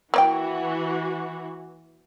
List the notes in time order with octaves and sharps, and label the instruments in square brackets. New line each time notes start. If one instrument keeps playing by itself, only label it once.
[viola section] E3 F#4 [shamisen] A#3 D5 G5